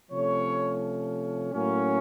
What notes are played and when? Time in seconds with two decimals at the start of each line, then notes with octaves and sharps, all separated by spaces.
0.11 C3 F3 A3 C#4 C#5
1.53 A2 F#3 A#3 C#4